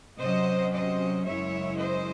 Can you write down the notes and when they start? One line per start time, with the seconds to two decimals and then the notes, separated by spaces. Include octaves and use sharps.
0.18 C3 F#3 C#4 C5 D#5
0.72 C5 D#5
1.25 F#2 C#3 G#3 C#4 E4 C#5 E5
1.78 C5 D#5